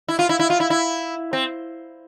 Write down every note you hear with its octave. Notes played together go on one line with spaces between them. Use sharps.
E4
F4
E4
E4
F4
E4
E4
C4